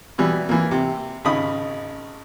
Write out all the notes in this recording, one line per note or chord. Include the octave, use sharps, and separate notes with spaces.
B2 E3 G3
E3 A#3
C3
G#1 C#3 D#4 B5 D#6